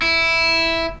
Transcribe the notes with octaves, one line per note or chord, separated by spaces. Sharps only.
E4